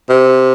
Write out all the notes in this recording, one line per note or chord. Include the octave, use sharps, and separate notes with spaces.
C3